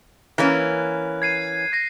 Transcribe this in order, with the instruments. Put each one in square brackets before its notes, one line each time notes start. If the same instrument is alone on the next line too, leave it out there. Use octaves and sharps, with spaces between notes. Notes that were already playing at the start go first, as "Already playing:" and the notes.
[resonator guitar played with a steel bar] E3 A#3 C#4 [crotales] F#6
[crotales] G#6 C7 D#7
G#6 A#6 C7